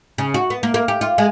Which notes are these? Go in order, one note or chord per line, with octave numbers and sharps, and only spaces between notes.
C#3
F#4
B3
A#3
A#3
G4
F4
G#3